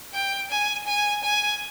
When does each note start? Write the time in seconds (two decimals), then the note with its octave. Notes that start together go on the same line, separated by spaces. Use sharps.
0.14 G5
0.50 G#5
0.87 G#5
1.24 G#5